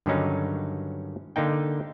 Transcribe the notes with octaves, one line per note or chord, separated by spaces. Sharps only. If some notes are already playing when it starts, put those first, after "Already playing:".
G2 D3 D#3 F#3 C#4 D#4
D3 A#3 D#4 G5